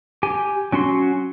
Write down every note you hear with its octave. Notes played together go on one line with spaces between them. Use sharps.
G4 G#5
F#3 C#4 F#4 C6